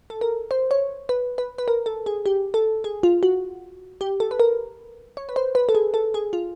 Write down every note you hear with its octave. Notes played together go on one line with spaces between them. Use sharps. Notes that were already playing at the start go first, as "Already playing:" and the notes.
A4
A#4
C5
C#5
B4
B4
B4
A#4
A4
G#4
G4
A4
G#4
F4
F#4
G4
A4
B4
A#4
C#5
B4
C5
B4
A4
G#4
A4
G#4
F4